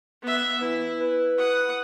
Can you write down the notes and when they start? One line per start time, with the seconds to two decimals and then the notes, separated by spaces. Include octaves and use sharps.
0.22 B3 E5
0.61 E3 E4
1.00 B4
1.38 F#5 D#6